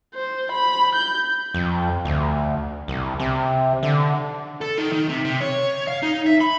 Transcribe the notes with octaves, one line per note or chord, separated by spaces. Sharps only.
C5
B5
G6
F2
D2
C2
C3
D3
A4
D#3
D#3
C3
C3
C#5
F5
D#4
E5
B5